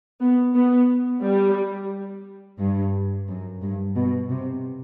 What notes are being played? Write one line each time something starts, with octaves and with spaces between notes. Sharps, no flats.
B3
B3
G3
G2
F#2
G2
B2
C3